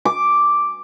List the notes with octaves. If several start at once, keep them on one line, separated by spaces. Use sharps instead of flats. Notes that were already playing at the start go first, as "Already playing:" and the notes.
D6